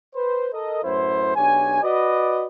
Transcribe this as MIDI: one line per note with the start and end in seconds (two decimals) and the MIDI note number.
0.15 0.48 71
0.15 0.48 72
0.53 0.83 69
0.53 0.83 70
0.53 0.83 75
0.84 1.33 42
0.84 1.33 45
0.84 1.33 64
0.84 1.33 71
0.84 1.33 72
1.36 1.80 35
1.36 1.80 62
1.36 1.80 67
1.36 1.80 73
1.36 1.80 80
1.83 2.47 66
1.83 2.47 71
1.83 2.47 74
1.83 2.47 75